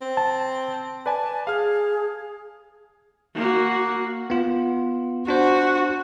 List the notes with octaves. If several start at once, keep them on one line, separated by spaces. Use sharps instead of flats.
C4
A5
B4 D5 G#5 A5
G#4 F5 F6
A#3 F#4
B3 F4
D4 F#4 C5